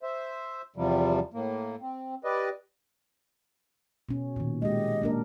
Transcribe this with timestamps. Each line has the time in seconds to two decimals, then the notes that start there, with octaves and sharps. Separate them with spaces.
0.03 C5 E5
0.76 E2 C3 F3 G3
1.33 A2 A#3
1.81 C4
2.24 G4 B4 D5 D#5
4.09 B2 C#4
4.36 A#2 D#3
4.62 G#3 G4 D#5
5.02 A#3 D4 A#4